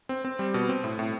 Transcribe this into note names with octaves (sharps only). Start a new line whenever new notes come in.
C4
C4
G3
B2
C4
A2
A2